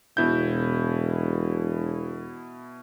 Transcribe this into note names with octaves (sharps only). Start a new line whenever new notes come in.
E1 B2 E4 G6